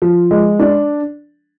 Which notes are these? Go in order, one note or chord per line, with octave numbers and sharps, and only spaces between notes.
F3
G#3
D4